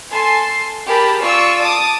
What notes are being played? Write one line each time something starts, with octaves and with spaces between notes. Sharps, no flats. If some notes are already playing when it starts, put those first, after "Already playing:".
A4 G#5 A5 C6
G4 G#4 A#4 A5 B5
F4 D5 C#6 E6
A5 D6 D#6